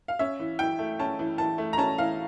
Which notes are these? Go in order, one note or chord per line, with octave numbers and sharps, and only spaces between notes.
F5
C#4 E5
E3
E3 G5
A3
C#4 A5
E3
E3 A5
A3
A#5
C#4 A5
E3 F5